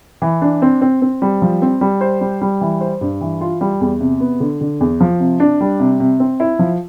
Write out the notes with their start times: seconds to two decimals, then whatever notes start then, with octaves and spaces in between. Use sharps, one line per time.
0.22 E3
0.42 D4
0.62 C4
0.81 C4
1.02 C4
1.22 G3
1.42 F3
1.62 C4
1.81 G3
2.01 C5
2.21 G3
2.41 G3
2.61 E3
2.81 C5
3.01 G2
3.21 E3
3.41 F4
3.61 G3
3.81 E2
4.01 C3
4.20 B3
4.40 D3
4.61 D3
4.80 E2
5.01 F3
5.20 C3
5.40 D4
5.61 G3
5.80 C3
6.00 C3
6.20 C4
6.40 E4
6.59 F3